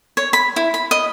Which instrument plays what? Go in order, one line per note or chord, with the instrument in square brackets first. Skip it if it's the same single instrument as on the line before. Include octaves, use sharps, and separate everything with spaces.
[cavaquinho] C#5
B5
E4
B5
D#5